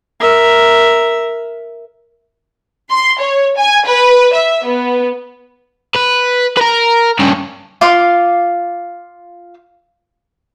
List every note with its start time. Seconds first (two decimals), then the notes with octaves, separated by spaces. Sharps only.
0.20 A#4 E5
2.90 C6
3.20 C#5
3.57 G#5
3.86 B4
4.33 E5
4.65 B3
5.96 B4
6.57 A#4 B4
7.20 G2 C#3
7.81 F4 F5 C6 D6